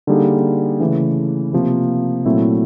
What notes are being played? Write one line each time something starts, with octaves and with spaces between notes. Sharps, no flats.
D3 G3 A#3 D#4 G#4
C#3 E3 A3
C3 F3 A#3
A#2 F#3 A3 C4 E4